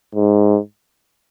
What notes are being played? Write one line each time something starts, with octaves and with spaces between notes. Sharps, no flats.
G#2